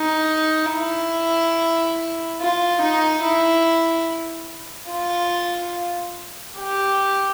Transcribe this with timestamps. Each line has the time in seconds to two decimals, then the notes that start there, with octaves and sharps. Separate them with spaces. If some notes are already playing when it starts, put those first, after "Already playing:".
Already playing: D#4
0.73 E4
2.41 F4
2.82 D#4
3.24 E4
4.91 F4
6.59 G4